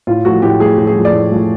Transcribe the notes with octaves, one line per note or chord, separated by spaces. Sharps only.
A2 F4
F3 A3 F#4
A2 G4
F3 A3 G#4
A2
G#4
F3 A3
D5
A2
F3 A3